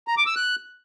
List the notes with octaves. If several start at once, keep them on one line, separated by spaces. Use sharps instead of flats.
A#5
D6
E6
F#6